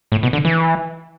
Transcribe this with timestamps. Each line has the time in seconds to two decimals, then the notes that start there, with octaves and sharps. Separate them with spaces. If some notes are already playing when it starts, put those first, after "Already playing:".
0.12 A2
0.23 B2
0.33 D3
0.45 E3